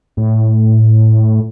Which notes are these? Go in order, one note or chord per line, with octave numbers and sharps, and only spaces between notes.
A2